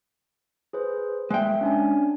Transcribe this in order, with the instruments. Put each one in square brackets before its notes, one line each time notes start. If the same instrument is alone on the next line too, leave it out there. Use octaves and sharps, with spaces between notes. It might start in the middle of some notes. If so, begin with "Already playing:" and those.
[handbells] G#4 B4 C5
[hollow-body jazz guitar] G#3 G5 [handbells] A#3 E5
[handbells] C#4 D4 G#5